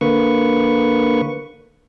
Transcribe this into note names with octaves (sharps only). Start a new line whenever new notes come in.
D3 A#3 B4 C#6